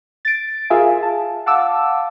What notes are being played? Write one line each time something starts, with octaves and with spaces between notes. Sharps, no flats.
A6 D7
F4 G#4 A#4 E5 F5 G#5
A5
F5 F#5 A5 D6 E6